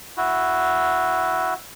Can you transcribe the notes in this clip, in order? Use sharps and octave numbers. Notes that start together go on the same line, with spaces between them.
E4 F#4